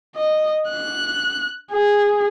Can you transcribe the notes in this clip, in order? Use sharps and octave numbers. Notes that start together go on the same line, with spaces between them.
D#5
F#6
G#4